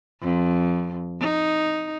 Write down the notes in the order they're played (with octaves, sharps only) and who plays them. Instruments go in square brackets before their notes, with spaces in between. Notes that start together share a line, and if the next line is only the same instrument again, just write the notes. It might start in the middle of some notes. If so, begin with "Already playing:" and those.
[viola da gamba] F2
D#4